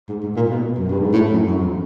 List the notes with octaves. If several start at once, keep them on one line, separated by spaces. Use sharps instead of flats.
G#2
G#2
A#2
B2
F#2
G2
G#2
A2
F#2
F#2
F2